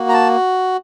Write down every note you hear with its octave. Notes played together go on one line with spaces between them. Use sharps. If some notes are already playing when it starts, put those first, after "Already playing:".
Already playing: A#3 F#4
A#5
A5